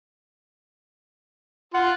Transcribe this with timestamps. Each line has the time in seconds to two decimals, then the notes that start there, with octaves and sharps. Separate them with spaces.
1.74 F4 F#5